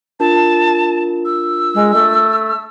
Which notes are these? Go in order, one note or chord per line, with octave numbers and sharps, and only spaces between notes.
D4 F4 A#4 A5
E6
G#3
A3